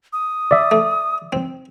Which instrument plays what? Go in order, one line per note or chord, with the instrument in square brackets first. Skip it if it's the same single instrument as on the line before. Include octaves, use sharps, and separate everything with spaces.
[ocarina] D#6
[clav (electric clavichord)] D5 E5
[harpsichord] A3
C4